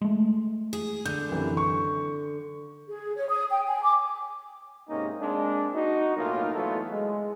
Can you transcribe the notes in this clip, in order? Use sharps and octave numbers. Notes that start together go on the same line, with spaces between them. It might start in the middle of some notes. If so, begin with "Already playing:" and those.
G#3 A3
G#4
D3 G6
F#2 C3 E3
C#6
G#4
C#5
D#6
G5
G#5
D6
G#2 C3 A#3 C#4 D#4
G#3 A#3 C4 D4
D#4 F#4
B1 A2 A#3 D#4 F4 A#4
E3 F#3 A3 B3 F4 A4
G#3